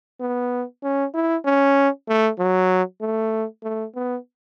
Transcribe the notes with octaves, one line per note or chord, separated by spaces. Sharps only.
B3
C#4
E4
C#4
A3
F#3
A3
A3
B3